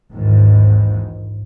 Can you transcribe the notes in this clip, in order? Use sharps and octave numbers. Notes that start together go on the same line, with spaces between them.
A#1 D#2 G#2 D#3 E3